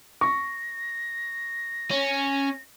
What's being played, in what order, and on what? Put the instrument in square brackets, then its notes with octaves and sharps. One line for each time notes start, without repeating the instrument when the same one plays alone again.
[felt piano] C#6 [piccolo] A#6
[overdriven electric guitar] C#4